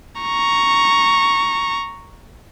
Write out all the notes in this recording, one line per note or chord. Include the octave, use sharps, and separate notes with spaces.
A#5 C#6